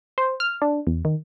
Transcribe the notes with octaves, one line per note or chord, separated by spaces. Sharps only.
C5
F6
D4
E2
D#3